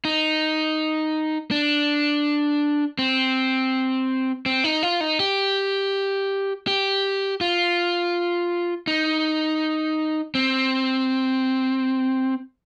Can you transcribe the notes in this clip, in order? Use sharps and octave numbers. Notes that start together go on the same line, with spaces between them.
D#4
D4
C4
C4
D#4
F4
D#4
G4
G4
F4
D#4
C4